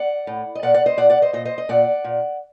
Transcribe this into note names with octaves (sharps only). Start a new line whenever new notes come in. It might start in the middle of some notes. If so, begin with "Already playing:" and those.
Already playing: D5 F#5
A2
D#5
A#2 D5 F#5
D5 F#5
C5 D#5
A#2 D5 F#5
D5 F#5
C5 D#5
A#2 C5 D#5
C5 D#5
D#5
A#2 D5 F#5
A#2